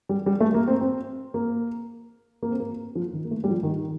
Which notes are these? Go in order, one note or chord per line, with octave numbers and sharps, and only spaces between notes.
G3
G3
A3
A#3
C4
C4
A#3
A#3
C4
A#3
F3
D#3
A#3
A3
G3
F3
D#3
D#3